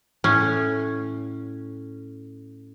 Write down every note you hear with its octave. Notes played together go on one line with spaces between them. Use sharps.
A2 C#4